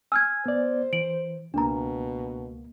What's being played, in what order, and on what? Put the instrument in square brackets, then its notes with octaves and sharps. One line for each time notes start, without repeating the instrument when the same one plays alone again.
[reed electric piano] G#5 [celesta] E6 F6 G#6
[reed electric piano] B3 D5 [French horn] C5
[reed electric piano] E3 [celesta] D7 F#7
[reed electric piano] C#2 A#3 [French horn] B2 [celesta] D4 A#5